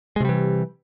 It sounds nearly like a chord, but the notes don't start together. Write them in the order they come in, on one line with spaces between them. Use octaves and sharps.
G#3 C3 G3 E3